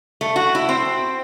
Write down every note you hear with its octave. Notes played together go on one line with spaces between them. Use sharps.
A3
F#4
E4
C4